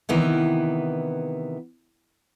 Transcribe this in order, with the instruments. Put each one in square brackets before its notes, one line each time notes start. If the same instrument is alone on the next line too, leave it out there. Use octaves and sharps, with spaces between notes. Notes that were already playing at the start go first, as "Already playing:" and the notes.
[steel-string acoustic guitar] C3 D#3 E3 B3